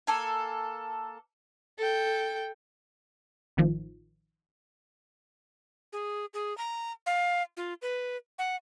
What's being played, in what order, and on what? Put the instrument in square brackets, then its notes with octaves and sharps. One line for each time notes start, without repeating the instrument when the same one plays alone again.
[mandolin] A#3 A4 G#5
[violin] A4 G5
[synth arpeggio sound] A1 D#3 F3
[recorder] G#4
G#4
A#5
F5
F4
B4
F#5